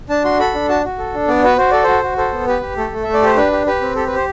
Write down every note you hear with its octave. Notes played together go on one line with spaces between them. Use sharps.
D4 A5
F#4 C6
A4 B5
D4
F#4 A5
F#4
A4
D4
B3 D5
F#4 B4
F#4 C5
A4 D5
F#4 C5
F#4
A4 C5
B3
G4 B4
G4
A3 A4
A3
A3 E5
D5
G4 C5
D4 B4
G4
G4 B4
C4
G4 A4
B4
G4 C5